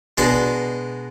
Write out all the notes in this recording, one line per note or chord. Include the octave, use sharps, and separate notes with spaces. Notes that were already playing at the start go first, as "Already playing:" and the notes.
B2 G#3 D4 A5